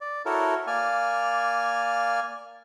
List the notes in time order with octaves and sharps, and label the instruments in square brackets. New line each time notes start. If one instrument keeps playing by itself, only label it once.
[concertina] D5
E4 F#4 A4 A#4 C#5
A#3 D5 G#5 F6